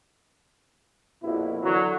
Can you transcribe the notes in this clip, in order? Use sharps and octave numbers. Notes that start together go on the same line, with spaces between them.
A#1 F2 B2 E4
D3 E3 F#3